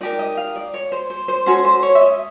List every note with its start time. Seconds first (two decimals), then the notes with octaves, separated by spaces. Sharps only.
0.01 D#4 G4 A#4 D5
0.19 D#5
0.37 F5
0.56 D5
0.74 C#5
0.92 C5
1.10 C5
1.28 C5
1.46 C#4 F#4 A4 C5
1.65 C5
1.83 C#5
1.95 E5
2.01 D#5